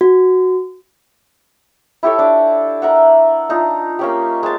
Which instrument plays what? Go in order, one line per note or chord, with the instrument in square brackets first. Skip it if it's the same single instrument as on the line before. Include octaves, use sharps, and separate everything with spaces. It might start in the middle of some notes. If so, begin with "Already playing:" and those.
[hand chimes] F#4
[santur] E4 G4 A4 C#5
D4 D5
A#4 E5 F#5
D4 D#4 F4
A#3 C#4 G4
G#3 A5